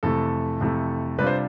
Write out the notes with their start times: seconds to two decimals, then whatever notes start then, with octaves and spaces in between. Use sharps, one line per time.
0.03 F2 C3 E3 A3 A4
0.61 F2 C3 E3 A3
1.19 C3 G3 D4 F4 B4
1.27 C5